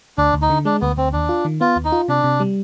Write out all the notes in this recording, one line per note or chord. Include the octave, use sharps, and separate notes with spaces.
D2 D4
D2
D#4
D3
G#3 D4
D2 B3
D2 C4
D#2 D4
F4
D#3
B3 F4
D#2
D#4
F4
C3 D4
C3
G3